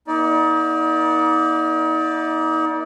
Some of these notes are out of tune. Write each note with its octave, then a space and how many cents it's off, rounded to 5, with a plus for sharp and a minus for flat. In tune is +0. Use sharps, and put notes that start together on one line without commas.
A#3 +45 D#4 +35 D5 +0